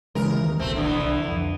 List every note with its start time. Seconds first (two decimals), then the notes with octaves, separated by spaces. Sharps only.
0.15 C#3 E3 G#3 A#4
0.39 D#2 D#3
0.59 D1 B1 A3 C4
0.76 D3 E3 B3
1.01 C2
1.28 F2